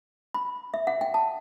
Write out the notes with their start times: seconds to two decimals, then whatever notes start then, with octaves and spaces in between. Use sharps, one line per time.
0.34 B5
0.74 E5
0.87 F#5
1.01 G5
1.14 A5